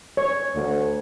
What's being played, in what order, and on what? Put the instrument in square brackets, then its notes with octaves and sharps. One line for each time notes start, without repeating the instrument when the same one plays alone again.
[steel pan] C#5
[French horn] D2